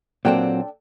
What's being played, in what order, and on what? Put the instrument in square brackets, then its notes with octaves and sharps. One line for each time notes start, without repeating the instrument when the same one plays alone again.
[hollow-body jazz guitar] A#2 F#3 C4 [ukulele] D4 A4 G5